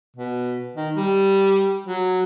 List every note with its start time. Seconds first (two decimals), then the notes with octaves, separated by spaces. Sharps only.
0.16 B2
0.76 D#3
0.96 G3
1.87 F#3